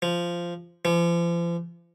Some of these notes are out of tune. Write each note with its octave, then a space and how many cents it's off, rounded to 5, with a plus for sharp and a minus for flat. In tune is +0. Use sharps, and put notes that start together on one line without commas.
F3 -10
F3 -40